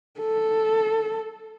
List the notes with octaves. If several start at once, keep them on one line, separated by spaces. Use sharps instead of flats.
A4